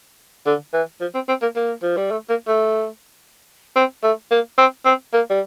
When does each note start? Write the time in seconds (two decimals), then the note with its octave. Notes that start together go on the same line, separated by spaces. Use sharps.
0.46 D3
0.73 E3
1.01 F3
1.14 C4
1.28 C4
1.42 A#3
1.56 A#3
1.82 F3
1.97 G3
2.11 A3
2.29 A#3
2.48 A3
3.76 C4
4.03 A3
4.31 A#3
4.58 C4
4.85 C4
5.13 A#3
5.30 G3